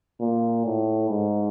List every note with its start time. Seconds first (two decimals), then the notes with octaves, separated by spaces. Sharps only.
0.20 A#2
0.66 A2
1.10 G#2